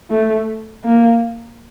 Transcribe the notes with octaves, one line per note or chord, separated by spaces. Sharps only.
A3
A#3